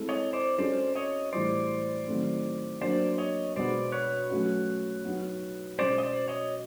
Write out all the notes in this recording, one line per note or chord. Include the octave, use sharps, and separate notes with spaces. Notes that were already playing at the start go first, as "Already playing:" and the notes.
Already playing: G#3 C4 E4 A4
C#5 D#5
C5 D5
G#3 C#4 F#4 A4 C5 D5
C#5 D#5
A2 E3 G3 C5 D5
D#3 F#3 A3 C4
F#3 A#3 D4 C5 D5
C#5 D#5
B2 G#3 B3 C5 D5
B4 C#5
F#3 A3 C#4 F#4
F#3 B3 D#4 F#4
B2 G#3 C#4 C5 D5
D#5
C5 D5
C#5 D#5